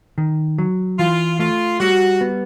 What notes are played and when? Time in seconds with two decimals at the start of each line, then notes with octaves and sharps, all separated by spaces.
0.18 D#3
0.58 F#3
0.99 E3 F4
1.39 A3 F4
1.80 G3 F#4
2.21 B3